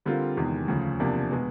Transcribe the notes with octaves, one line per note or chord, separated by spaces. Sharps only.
D3 G3 C4 F4 A#4
E2 C3 D#3 G#3
D2 C#3 F3
E2 C3 F3 A#3 D4
B2 G#3 B3